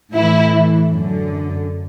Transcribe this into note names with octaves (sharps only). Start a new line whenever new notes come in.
A2 E3 E4
F#2 D3